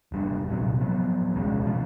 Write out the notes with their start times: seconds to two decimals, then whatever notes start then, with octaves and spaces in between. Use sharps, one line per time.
0.12 F1 G3 D4
0.49 D#1 A#1 C3 F#3
0.81 F3 F#3 B3
1.34 D#1 C2 G#3 C#4
1.67 B2 F3